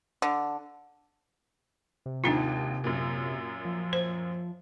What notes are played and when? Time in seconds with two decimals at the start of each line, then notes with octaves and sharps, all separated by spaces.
0.22 D3
2.06 C3
2.24 G#1 D#2 D4 D#4 F4
2.84 F#2 A#2
3.65 F3
3.93 C5